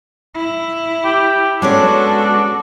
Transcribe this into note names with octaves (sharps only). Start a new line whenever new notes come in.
E4
G4
G#3 B3 C#4 D4 F#4 A4